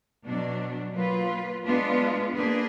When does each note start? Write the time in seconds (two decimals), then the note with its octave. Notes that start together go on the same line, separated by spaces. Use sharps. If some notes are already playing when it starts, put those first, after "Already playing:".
0.24 B2 F#3 D4
0.95 F#3 A#3 F4 B4
1.65 G#3 B3 D4 F4 B4
2.35 A#3 D4 G#4 B4